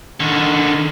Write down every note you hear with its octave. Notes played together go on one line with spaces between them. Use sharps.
D3 D#3